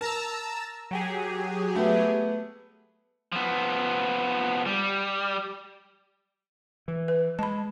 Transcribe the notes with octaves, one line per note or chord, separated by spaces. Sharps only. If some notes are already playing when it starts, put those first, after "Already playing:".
A#4 A5 A#5 E6
F#3 G4 G#4
A3 B3
F3 B3
G3
E3
B4
G#3 A5 B5